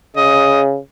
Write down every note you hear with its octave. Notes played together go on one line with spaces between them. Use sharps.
C#3 D#5